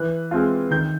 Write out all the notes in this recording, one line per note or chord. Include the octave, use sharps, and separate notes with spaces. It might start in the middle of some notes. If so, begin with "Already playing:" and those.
Already playing: E3 F#6
G#3 C4 F4
D#3 G6